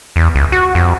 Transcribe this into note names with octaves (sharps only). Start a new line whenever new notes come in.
E2
C#2
F#4
F2